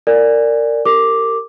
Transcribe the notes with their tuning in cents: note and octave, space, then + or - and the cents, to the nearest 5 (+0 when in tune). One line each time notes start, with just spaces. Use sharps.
A#4 -25 D5 +0 G#5 -20
G4 +0 A#4 -35 D6 +0